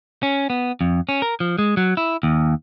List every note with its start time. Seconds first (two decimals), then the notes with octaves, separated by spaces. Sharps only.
0.23 C#4
0.50 B3
0.81 F2
1.09 C#4
1.22 A#4
1.40 F3
1.59 G#3
1.77 F#3
1.97 E4
2.23 D#2